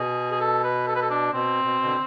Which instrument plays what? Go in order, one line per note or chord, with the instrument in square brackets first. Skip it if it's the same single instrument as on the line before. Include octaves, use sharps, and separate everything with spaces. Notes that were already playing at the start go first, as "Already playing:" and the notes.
Already playing: [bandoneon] B2 [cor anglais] G#4
[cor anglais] G#4
A4
B4
A4
B4
A4
D4
[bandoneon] B2 [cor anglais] C4
[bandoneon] B2
D3